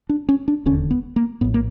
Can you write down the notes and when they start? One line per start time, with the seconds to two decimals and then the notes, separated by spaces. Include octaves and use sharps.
0.09 D4
0.29 C#4
0.48 D4
0.65 E1 D#2 D3 C#4
0.91 B3
1.16 A#3
1.41 A#1 A2 B3
1.54 A#3